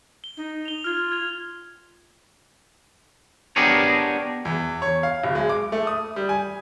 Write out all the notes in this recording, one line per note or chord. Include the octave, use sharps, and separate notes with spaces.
G7
D#4
F7 G7
F4 F6 G#6
F6 G#6 F7
B3 D4 G4 G#4 A#4 C#5
E2
C#5
F5
D1
G#3
D6
A3
D#6
G3
G#5